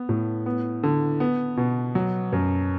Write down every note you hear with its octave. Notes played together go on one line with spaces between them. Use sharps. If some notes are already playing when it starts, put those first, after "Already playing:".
Already playing: B3
A2
B3
D3
B3
B2
F#3
F#2